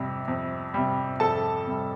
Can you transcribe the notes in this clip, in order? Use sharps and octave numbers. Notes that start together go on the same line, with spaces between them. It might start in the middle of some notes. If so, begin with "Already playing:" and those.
Already playing: F2 C3 G3
F2
C3 G3
F2 A4 A5
C3 G3